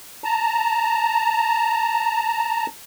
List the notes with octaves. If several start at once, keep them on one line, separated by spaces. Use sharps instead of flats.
A5 A#5